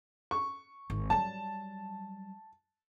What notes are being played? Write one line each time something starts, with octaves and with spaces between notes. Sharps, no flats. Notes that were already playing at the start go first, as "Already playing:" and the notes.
C#6
G#1
F#3 G3 A5